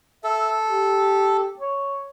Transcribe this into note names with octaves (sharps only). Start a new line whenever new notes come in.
A4 E5
G4
C#5